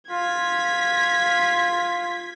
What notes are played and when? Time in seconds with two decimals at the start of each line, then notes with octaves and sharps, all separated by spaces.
0.11 F4 G#6 B6